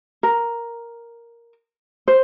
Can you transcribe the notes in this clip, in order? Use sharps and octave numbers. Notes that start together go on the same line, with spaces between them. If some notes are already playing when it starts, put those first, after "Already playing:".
A#4
C5